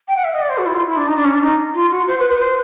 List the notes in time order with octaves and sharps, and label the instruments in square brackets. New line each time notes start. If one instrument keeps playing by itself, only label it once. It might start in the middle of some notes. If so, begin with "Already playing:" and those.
[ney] G5
F#5
E5
D#5
D5
C5
F#4
E4
F4
E4
D4
D#4
D4
C#4
D4
D#4
F4
F#4
C5
B4
B4
C5